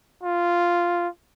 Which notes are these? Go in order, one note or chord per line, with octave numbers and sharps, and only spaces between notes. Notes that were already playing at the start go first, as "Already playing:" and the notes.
F4